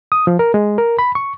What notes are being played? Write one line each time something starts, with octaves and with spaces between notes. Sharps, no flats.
D#6
F3
A#4
G#3
A#4
B5
C#6